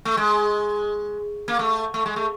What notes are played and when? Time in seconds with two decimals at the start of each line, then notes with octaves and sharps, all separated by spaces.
0.05 A3
0.17 G#3
1.48 A#3
1.59 A3
1.94 A3
2.06 G#3
2.16 A3